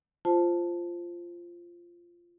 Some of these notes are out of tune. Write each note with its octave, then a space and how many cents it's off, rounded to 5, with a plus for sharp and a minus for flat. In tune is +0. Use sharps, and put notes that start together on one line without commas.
F4 -10 C5 +0 A5 +0